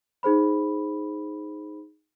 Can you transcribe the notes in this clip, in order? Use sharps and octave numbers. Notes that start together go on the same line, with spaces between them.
D#4 G#4 C5 B5